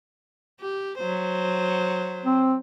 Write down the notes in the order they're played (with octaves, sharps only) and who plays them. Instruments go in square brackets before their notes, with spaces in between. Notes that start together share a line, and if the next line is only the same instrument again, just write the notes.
[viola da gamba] G4
F#3 C5
[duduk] C4